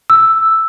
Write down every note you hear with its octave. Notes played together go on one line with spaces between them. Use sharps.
E6